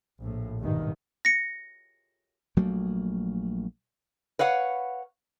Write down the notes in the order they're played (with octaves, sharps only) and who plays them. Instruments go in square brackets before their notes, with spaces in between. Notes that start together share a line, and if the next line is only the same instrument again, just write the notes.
[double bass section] A#1 A2
G#1 E2 G2 B2 D#3
[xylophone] A#6 C#7
[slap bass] A#1 F#3 A3 A#3
[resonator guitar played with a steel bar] B4 C#5 F5 F#5